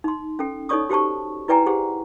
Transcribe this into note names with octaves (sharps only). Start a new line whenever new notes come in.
D#4 C6
C#4 A4 G5
D#4 A4 C#5 D5 C#6 D#6
F#4 G4 C5 A5 C#6
E4 B4 D5 G5 G#5 A#5
G4 G#4 C5 F#5